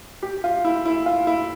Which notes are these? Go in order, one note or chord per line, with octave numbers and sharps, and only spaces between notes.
G4
F4
E4
E4
F4
E4